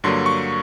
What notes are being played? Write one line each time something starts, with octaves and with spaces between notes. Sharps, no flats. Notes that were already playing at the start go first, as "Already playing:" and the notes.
G2 D3 F#3 A#3 C6
C#6